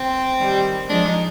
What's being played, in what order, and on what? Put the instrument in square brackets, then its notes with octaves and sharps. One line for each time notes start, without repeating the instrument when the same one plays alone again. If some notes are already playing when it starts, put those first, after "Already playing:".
Already playing: [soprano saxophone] C4
[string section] D#3 G3
[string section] F3 G#3 [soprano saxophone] D4
[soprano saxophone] D#4